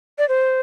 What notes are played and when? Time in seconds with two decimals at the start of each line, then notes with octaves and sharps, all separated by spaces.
0.18 D5
0.28 C5